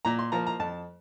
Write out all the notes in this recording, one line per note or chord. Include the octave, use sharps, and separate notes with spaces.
A#2 A#5
C6
F3 A#3 A#5
A#5
F2 A5